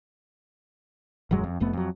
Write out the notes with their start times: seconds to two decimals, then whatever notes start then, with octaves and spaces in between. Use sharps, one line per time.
1.31 D#1 F#2 F#3 G#3
1.44 F2
1.60 F1 F2 A3 B3
1.73 F2 F#3